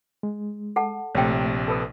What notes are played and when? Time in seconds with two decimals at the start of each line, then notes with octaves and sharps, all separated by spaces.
0.23 G#3
0.76 A4 F#5 A5
1.15 A#1 C3 A3 C#5 G5
1.68 A4 B4 D#6